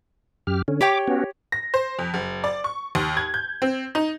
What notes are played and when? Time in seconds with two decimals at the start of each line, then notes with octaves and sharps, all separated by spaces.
0.47 F#2 G4 F6
0.68 D3 C#4
0.81 G4 C#5 G5 D6
1.08 B3 C#4 F#4
1.52 A#6
1.74 C5
1.99 F2
2.14 F#1
2.44 D5
2.64 C#6
2.95 D#2
3.17 G#6
3.34 G6
3.62 C4
3.95 D#4